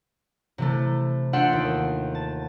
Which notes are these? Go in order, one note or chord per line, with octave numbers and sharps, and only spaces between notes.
C3 E3 A3
D4 F4 E5 F#5 G5 C6
D#2
A5